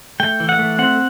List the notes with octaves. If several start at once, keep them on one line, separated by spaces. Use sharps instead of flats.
A3 G5
E3
F#5
A3
C4 F#5